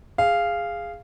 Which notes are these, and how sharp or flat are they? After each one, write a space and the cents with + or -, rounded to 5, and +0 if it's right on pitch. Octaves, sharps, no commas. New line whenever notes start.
G#4 -10 F5 -10